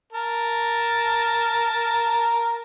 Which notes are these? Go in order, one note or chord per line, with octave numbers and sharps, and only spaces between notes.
A#4 A5